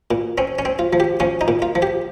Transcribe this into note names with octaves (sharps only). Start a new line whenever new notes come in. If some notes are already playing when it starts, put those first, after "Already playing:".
A#2
C4 C#4
C#4
C4
F4
F3
G4
F3 C#4
D#4
A#2
F4
F3
G4